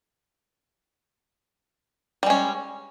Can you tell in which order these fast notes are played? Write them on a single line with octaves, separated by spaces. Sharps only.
G3 G#3 C#4